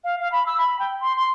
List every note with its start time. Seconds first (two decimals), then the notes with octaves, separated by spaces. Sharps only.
0.04 F5
0.20 F5
0.32 B5
0.46 E6
0.58 B5
0.79 G5
1.01 C6
1.17 C6